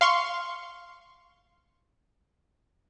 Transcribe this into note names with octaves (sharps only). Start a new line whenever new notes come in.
F5 C6 C#6